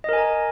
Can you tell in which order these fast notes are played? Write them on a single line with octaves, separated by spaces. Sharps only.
D#5 A#4 G#5 A#5